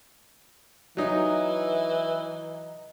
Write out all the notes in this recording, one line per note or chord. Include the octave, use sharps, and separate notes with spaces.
E3 F#3 D#4